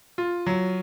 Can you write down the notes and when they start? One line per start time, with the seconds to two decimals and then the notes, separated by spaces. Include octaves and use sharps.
0.18 F4
0.46 F#3